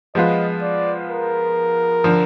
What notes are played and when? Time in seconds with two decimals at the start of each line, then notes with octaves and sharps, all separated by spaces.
0.15 F3 G#3 B3 F4 D#5
0.62 D5
1.09 A#4
2.04 D3 F3